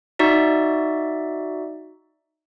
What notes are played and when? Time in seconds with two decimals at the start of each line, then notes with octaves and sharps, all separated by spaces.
0.19 D#4 F#4 D5 E5